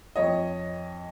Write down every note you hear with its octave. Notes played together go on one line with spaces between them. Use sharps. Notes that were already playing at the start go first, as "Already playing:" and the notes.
F2 C#5 D#5